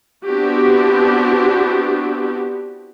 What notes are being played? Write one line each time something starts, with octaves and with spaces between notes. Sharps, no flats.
B3 C4 D4 E4 F#4 G4